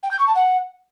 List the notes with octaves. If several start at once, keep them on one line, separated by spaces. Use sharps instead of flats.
G5
G6
C#6
A5
F#5